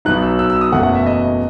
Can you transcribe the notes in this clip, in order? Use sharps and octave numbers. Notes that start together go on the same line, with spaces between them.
B1 B2 F#3 B3 D#4 F#6
E6
E6
E6
D#6
F#1 E2 B2 F#3 A3 F#5
F#5
E5
D#5